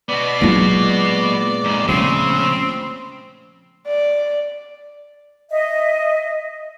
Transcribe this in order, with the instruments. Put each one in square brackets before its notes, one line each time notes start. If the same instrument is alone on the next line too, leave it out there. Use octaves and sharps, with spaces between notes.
[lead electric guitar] B3 F#4 [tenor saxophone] D5
[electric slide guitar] A#2 G#3 D4 [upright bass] F#3 F4
[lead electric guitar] F2 G#2
[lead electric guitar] C#3 [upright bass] F3 A3 [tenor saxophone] C4
[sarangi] D5
[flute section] D#5 E5